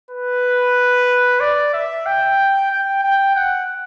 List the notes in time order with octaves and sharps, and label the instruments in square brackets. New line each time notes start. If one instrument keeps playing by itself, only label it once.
[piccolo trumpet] B4
D5
E5
G5
G5
G5
F#5